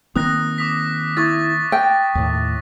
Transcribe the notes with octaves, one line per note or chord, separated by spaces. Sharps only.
D#3 A#3 C4 D#6 F#6 A#6
D6 D#6 B6
E4 C#6 A6
G5
D#2 A2